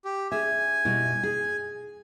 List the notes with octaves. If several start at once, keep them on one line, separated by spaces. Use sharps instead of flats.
G4
D4 G#4 E5 G#5
B2 G3 E4
G#4